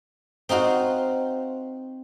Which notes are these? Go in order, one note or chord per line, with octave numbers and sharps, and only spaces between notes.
C4 D#4 F4 F#4 C5